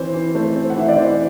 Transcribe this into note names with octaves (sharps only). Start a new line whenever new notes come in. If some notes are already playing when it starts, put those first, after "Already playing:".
Already playing: E3 C4 C5
E3
A3 C5
C4
F#5
E3 E5
D5
E3 C5